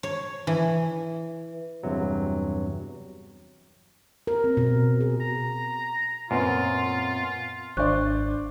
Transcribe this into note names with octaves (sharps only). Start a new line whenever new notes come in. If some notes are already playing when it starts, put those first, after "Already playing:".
C#5
E3
E2 G2 C3 F#3
A#4
C4
B2
G#4
A#5
F#2 A#2 B3 C4 F4
G#1 D4 C5 D5 C#6 F#6